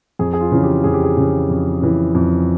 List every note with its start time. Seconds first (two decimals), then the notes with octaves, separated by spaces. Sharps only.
0.19 F2 G#4
0.33 G#4
0.41 F4
0.52 C#3 E3
0.63 G4
0.84 F2 G#4
0.94 G4
1.04 G#4
1.17 C#3 E3
1.50 F2
1.82 C#3 E3
2.15 F2